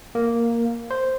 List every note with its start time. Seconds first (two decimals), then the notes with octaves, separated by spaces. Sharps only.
0.15 A#3
0.91 C5